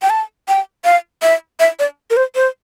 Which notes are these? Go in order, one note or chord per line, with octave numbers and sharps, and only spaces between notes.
G5
A5
G5
F5
E5
E5
D5
A#4
C5
C5